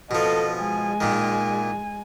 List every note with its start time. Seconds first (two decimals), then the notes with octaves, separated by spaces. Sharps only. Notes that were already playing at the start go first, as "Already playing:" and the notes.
0.11 B2 F3 A4 D#5
0.59 G#3 G#5
1.01 A#2 D#3